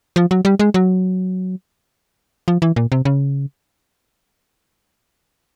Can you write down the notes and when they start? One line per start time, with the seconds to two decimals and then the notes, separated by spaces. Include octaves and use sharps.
0.16 F3
0.31 F#3
0.45 G3
0.59 G#3
0.74 F#3
2.48 F3
2.62 E3
2.76 A#2
2.92 C3
3.05 C#3